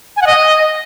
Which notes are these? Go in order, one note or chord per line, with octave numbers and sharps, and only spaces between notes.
G#5
F#5
D#5